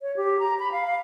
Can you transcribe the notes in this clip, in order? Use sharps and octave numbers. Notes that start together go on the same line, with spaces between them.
C#5
G4
A#5
B5
F5
F5